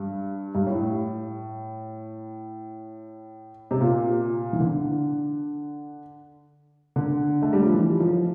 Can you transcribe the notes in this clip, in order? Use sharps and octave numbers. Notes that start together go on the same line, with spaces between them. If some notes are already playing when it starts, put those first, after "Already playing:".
Already playing: G2
G2
A2
C3
A#2
E3
D3
D3
A3
G3
F3
E3
F3